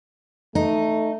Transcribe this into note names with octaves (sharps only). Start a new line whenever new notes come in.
A3 D#4